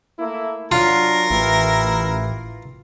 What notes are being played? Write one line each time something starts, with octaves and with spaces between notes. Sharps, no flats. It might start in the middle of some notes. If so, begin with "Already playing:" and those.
A3 A#3 E4
F#3 D4 F4 A#4
A1 E4 G4 B4